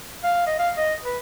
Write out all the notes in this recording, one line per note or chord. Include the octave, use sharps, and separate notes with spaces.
F5
D#5
F5
D#5
B4